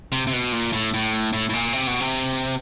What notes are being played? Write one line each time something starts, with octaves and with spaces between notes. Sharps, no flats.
C3
C3
B2
A#2
A2
A2
A2
A2
A#2
C3
B2
C3